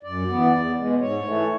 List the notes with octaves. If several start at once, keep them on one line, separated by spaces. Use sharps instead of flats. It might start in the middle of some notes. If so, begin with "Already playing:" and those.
F#2 D5
E3 B3
E2
B2 G#3
G#2 C#5
E3 A3